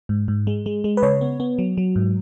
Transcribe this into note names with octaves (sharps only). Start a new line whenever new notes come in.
G#2
G#2
G#3
G#3
G#3
B4
C#3 C#5
B3
B3
F#3
F#3
G#2